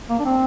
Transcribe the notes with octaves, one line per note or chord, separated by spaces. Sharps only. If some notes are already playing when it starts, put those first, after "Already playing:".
A#3
D4
C4